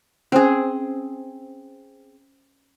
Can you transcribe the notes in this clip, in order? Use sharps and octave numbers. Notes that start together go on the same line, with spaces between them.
C4 C#4 G#4 C5